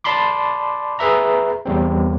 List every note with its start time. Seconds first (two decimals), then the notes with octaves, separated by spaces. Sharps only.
0.04 D5 A5 B5 C6 D6
0.99 G#4 B4 E5 A#5
1.65 E2 G3 C4